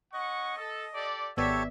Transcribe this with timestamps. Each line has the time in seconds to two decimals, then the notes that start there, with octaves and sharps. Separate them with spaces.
0.13 C#4 D#5 F#5 C#6
0.57 A4
0.94 G4 A4 D5
1.37 G#1 B3 G4 A4 C#5 D5 E5